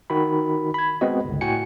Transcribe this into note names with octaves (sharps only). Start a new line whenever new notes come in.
D#3 F#4 B5
B5 G#6
G#3 B3 C4 F#4 D#5
G1 C#2
A2 F#4 G5 G#5 C#7